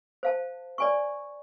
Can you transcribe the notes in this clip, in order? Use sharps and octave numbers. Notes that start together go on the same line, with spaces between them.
C5 F5 A5
D5 G#5 C#6